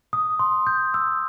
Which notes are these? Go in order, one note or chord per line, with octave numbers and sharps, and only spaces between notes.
D#6
C6
G6
E6